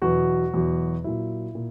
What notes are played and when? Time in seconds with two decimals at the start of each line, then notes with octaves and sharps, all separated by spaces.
0.02 E2 B2 F#3 F#4
0.54 E2 B2 F#3
1.04 A#2 F#3 E4
1.55 A#2